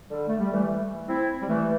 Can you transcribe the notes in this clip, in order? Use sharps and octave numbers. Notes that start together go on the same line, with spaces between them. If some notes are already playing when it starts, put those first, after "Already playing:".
D3 G3
A3
G3
E3 A3
C4 E4
G3
E3 A3